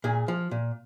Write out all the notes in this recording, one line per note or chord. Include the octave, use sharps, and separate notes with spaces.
A#2 G#4
F3
A#2